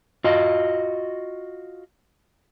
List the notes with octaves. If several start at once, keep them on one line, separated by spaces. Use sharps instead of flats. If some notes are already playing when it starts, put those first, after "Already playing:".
F4 F#4 D#5